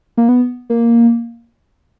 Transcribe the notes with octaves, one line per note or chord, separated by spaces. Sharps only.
A#3
B3
A#3